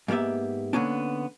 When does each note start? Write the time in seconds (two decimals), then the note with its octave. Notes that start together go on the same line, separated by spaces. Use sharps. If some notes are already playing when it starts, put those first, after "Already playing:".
0.08 G#2 A#3 B3 G4 E5
0.73 D3 A#3 B3 C#4 D4